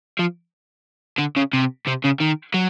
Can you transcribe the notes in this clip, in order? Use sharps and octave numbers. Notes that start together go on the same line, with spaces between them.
F3
D3
C#3
C3
C3
C#3
D#3
F#3